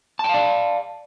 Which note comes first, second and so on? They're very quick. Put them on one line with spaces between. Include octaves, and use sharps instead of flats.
A5 G5 F5 D5